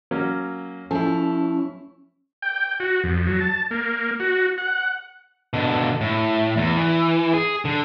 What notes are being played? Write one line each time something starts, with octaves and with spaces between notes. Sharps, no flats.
F#3 A#3 C#4
F3 C#4 E4 A4
G5
F#4
F2
F#3
A5
A#3
F#4
F#5
B2 D3
A2
E2
E3
G#4
D3